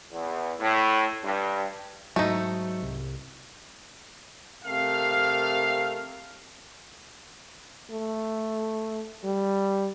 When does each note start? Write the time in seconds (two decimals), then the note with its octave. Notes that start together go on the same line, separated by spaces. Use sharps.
0.12 E2
0.60 A2
1.24 G2
2.16 G#2 F#3 A3 D#4
2.82 C2
4.65 C3 A3 G4 A#4 F5
7.90 A3
9.24 G3